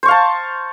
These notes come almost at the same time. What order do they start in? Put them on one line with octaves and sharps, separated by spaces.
C5 C#6 F5 A5